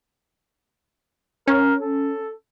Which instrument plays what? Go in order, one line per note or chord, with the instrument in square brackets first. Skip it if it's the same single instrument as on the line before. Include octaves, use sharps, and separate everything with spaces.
[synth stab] C#4 [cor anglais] A#4
[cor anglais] A4